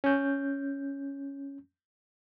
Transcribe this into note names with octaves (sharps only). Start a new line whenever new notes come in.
C#4 G6